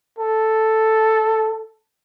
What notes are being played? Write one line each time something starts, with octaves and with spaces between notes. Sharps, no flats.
A4